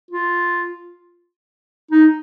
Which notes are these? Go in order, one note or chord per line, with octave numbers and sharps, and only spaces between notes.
F4
D#4